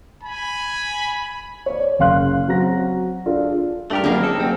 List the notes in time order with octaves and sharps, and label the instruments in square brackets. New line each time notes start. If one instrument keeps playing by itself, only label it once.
[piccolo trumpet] G#5 [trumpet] B5
[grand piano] C#5 D5
F#1 C#3 F5 C6 F#6
F#3 C4 F#4 A#5 A#6
D4 F4 G#4 A4
[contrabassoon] G2 [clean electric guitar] A3 G4 A#4
[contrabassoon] F#1 [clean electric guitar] F2 G3 A#3 [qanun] G#4 A#4
[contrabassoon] F1 [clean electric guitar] A4
[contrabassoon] F#1 [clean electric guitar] C4